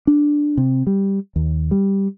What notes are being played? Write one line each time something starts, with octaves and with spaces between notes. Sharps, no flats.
D4
C3
G3
D#2
G3